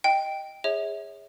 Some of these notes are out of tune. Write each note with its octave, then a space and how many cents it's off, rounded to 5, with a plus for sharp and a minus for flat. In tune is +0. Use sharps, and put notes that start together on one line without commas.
D#5 +0 G5 +0
G#4 -20 C#5 +0 E5 -30